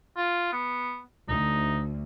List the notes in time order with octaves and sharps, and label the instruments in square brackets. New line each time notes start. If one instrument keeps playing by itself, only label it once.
[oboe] F4
B3
[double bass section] D2 [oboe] D#4